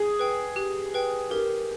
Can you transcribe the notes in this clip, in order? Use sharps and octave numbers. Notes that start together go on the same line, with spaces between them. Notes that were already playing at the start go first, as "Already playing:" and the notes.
Already playing: G#4
B4 G5
G4
B4 G5
G4 A#4